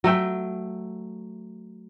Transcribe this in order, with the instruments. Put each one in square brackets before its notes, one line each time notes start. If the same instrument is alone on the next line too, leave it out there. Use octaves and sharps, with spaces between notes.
[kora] F#3 A3 E5 G5